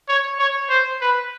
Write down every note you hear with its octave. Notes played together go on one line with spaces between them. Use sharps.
C#5
C#5
C5
B4